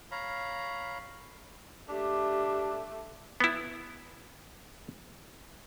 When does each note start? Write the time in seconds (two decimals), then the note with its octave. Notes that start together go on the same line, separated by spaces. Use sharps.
0.11 C#5 F5 A#5 B5
1.89 A3 D4 G4
3.40 B3 E4